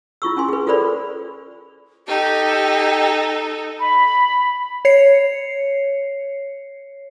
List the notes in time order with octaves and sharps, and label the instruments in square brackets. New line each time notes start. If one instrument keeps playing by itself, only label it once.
[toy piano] E4 F4 C#6 E6
C#4 G#5 C6
G#4 B4
F4 A4 A#4 C5 D5 B5
[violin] D#4 A4 [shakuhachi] G4
[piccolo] B5
[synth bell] C#5 C7 C#7